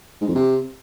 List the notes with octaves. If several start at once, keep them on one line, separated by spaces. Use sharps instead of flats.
G#2
F2
C3